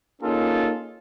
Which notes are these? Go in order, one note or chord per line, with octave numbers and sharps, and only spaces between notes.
A#3 C#4 D#4 F4 G#4 A4